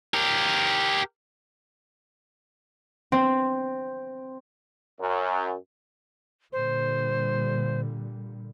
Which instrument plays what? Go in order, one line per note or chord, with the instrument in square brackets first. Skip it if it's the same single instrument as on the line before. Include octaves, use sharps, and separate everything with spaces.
[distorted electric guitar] G4 A#4
[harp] C4
[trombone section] F#2
[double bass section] A#2 D3 G3 [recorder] C5